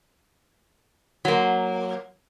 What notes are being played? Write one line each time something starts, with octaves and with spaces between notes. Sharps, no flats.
F#3 A#3